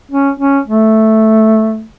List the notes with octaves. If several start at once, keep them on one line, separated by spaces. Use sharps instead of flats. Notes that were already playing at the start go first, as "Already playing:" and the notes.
C#4
C#4
A3